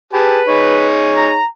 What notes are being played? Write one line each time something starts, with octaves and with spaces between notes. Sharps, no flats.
G4 G#4 B4 A5
D#4 G#4 C#5
A#5